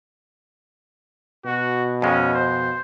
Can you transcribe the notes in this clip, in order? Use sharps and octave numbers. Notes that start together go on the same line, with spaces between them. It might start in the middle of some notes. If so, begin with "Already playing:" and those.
B2 F#4
F2 G#3 C#4
C5